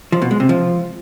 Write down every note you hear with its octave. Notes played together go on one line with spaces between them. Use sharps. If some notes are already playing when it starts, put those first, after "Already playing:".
F3
B2
G#3
C3
F3